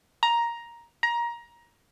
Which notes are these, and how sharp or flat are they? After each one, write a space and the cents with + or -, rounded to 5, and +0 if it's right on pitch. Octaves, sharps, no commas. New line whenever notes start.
A#5 +10
A#5 +20